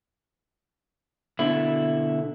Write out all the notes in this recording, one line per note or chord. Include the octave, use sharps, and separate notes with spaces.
B2 D3 E4